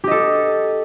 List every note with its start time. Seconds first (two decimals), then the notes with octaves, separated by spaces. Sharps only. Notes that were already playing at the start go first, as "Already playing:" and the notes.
0.04 G4
0.07 D#5
0.11 A4